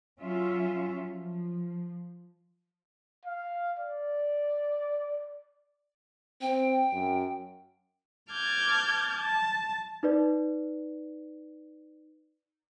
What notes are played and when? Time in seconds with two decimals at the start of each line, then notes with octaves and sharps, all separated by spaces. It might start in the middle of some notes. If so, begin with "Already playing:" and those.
0.20 F#3 C#4 F4 E5
1.09 F3
3.25 F5
3.79 D5
6.42 C4 G5
6.93 F#2
8.31 A5 D6 F6 G6 G#6
9.16 A5
10.03 D#4 B4 D5